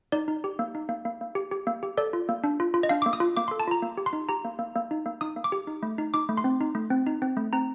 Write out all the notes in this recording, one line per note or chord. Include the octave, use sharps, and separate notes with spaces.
D#4 D5
D#4
G4
A#3
D#4
A#3
A#3
A#3
G4
G4
A#3
G4
A4 D5
F4
A#3
D4
F4
F4
D#5
D4 F5
A#3 D6
D#6
F4
A#3 D6
A4 C6
A5
F4 A#5
A#3
G4
C6
D#4
G4 A#5
A#3
A#3
A#3
D#4
A#3
D#4 D#6
A#3
D6
G4
D#4
A3
D#4
D#4 D6
A3
C6
C4
D#4
A3
C4
D#4
C4
A3
C4 A#5